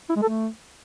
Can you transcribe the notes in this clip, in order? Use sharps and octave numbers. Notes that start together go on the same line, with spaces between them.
E4
G#3
A4
A3